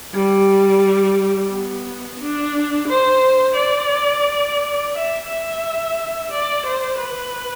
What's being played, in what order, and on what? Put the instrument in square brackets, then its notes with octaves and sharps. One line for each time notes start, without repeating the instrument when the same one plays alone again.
[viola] G3
B3
D4
C5
D5
E5
E5
D5
C5
B4